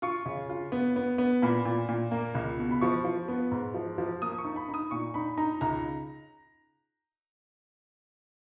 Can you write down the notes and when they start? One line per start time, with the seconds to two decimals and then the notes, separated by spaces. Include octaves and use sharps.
0.02 F4 C#6
0.26 C#3
0.50 F4
0.72 B3
0.96 B3
1.18 B3
1.42 A#2 B5
1.65 A#2
1.89 A#2
2.11 A#3
2.35 C#2
2.59 B2
2.71 B5
2.81 F3 C#6
3.05 F3
3.28 B3
3.51 G#2
3.74 F3
3.98 F3
4.22 A#3 D#6
4.32 D#6
4.38 C#6
4.44 D#4
4.56 B5
4.69 D#4
4.74 D#6
4.91 A#2 C#6
5.14 D#4 B5
5.37 D#4 A#5
5.61 C#2 A#5